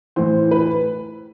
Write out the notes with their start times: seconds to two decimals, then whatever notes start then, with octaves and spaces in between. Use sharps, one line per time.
0.16 A2 E3 C5
0.51 B4